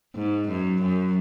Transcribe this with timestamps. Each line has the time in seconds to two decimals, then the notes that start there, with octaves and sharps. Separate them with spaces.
0.15 G#2
0.48 F#2
0.82 F#2